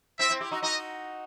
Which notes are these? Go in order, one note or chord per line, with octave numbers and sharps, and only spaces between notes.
C4 E4 E5
C4 E4
E4 G4
D#4 F#4
D#4 F#4 D#5